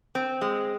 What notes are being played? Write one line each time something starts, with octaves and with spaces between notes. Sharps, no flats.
C4
G#3